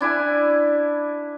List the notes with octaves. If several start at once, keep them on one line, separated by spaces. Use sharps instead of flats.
D4 E4 D5 G#5